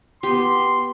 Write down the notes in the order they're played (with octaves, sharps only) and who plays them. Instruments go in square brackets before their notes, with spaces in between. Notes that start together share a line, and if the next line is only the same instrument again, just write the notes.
[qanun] B3 G4 [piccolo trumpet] C6